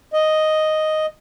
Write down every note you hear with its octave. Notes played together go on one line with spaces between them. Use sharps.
D#5